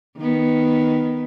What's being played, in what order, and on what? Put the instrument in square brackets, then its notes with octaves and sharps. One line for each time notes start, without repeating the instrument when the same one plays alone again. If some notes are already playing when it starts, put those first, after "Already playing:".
[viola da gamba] D#3 B3